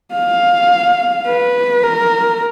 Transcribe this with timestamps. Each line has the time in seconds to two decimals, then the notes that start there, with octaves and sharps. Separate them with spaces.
0.14 F5
1.27 B4
1.83 A#4